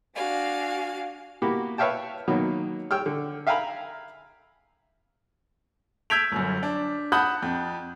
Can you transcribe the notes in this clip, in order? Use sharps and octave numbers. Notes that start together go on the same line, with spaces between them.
D4 F#4 F5 G#5
A#3 B3 E4 F#4 G4
B4 C#5 E5 F5 G5 A5
B2 D#3 F#3 A#3 B3
C#5 G5 E6 F6
D3
E5 F5 G5 G#5 A#5 B5
E6 G6 G#6 B6 D7 F7
G1 F#2
D4
F#5 A5 B5 D#6 F#6 G6
F2